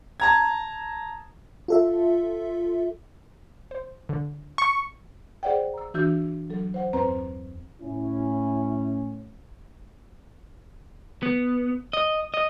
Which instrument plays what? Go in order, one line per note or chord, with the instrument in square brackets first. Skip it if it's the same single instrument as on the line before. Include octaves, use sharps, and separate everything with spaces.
[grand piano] A5 A#5 G#6
[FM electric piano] F4 A4 E5
[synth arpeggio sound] C5
D3
[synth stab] C#6
[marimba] G#4 C5 D5 F#5 G5
A#5 E6
E3 D4 F#4 E6 G6
F#3 A4
C5 F#5
E2 G2 C4 B4 C5 A#5
[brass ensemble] A2 C#4 [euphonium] E4
[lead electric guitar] B3
D#5
D#5